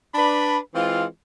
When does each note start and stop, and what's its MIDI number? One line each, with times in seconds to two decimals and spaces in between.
0.15 0.58 62
0.15 0.58 71
0.15 0.58 83
0.74 1.04 52
0.74 1.04 56
0.74 1.04 60
0.74 1.04 65